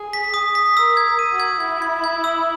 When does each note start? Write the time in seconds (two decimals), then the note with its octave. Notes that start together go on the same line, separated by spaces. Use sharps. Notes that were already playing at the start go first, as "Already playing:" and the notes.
Already playing: G#4
0.13 B6
0.34 D#6
0.55 B6
0.77 A#4 E6
0.97 G#6
1.19 D#7
1.33 F#4
1.40 G#6
1.60 E4 G#6
1.82 G#6
2.04 G#6
2.24 E6